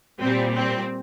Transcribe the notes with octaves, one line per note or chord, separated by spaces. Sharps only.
A#2 G3 C4
C4